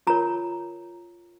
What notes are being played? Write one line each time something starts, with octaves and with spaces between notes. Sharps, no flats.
F4 A#4 C#5 A#5